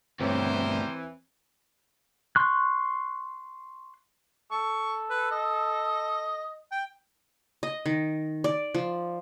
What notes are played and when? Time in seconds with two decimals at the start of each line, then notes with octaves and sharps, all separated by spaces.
0.20 D2 G2 E3 C4 G4 A#4 C5 C#5
2.36 C6 C#6 F#6
4.51 A4 C#6
5.10 B4
5.31 D#5
6.71 G5
7.63 D#5
7.86 D#3
8.44 D5
8.75 F3